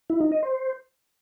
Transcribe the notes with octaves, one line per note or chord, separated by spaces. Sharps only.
E4
D#4
D#5
C5